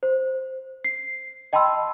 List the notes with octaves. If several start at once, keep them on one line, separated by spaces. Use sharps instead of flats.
C5
C7
D#5 G5 A5 B5 C6 E6